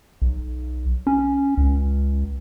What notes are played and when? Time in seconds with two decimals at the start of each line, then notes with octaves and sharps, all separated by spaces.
0.22 B1
1.07 C#4
1.57 C#2